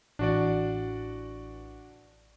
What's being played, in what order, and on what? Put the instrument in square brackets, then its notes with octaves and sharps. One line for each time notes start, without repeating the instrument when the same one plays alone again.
[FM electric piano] A1 E3 [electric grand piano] D4 F#4 D5